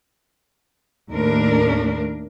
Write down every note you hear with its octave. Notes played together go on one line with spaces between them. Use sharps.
D#2 A2 A3 D4 A#4